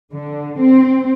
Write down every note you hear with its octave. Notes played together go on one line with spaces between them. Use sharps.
D3
C4